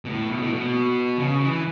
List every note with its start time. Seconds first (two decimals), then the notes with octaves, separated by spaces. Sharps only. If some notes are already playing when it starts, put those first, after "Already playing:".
0.05 B2
0.09 A2
0.31 B2
0.42 A2
0.53 B2
1.19 C#3
1.41 E3